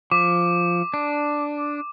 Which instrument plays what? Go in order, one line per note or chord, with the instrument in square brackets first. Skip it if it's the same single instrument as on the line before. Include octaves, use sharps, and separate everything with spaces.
[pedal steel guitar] F3 [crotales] D6
[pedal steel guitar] D4